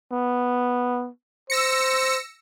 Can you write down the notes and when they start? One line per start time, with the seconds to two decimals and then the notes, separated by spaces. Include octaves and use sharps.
0.12 B3
1.50 C5 E6 A#6 C#7